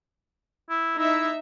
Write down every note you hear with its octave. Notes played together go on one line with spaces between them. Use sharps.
E4
D#4 E4 E5